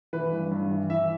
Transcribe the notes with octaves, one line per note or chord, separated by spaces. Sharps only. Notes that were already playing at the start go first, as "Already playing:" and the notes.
E3 B4
G2
G2
E3
E3 E5